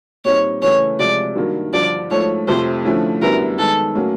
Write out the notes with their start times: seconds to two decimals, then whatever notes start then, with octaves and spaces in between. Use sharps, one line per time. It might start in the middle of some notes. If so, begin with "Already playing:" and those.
0.25 A#2 G3 C4 D#4 C#5
0.62 C#3 E3 A3 C#5
0.99 C3 F3 G#3 D5
1.36 G2 D#3 F#3 A#3
1.73 G2 D3 F3 D5
2.10 G#2 F3 A3 C#5
2.47 F2 C3 F3 A3 C5
2.85 D3 F3 A3 C#4 E4
3.22 F#2 D3 G3 B3 E4 A#4
3.58 D#3 G#3 B3 A4
3.95 A2 F#3 A#3 C#4